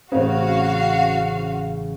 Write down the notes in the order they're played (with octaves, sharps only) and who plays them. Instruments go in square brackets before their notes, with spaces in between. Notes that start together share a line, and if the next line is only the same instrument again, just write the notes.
[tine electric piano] A1 C#3 [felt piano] C4 C5 [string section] F#4 F5